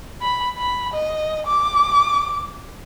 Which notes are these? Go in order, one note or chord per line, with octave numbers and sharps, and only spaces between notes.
B5
B5
D#5
D6